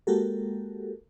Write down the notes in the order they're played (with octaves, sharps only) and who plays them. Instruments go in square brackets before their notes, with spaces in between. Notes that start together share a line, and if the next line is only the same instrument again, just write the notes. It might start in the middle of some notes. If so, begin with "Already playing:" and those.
[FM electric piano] G#3 A#3 F#4 G4 A4 A#4